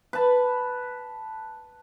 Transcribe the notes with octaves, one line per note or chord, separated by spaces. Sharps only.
B4 A5